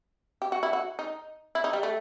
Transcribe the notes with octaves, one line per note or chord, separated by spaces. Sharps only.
G4
F#4
E4
F#4
D#4
E4
D#4
G3
A3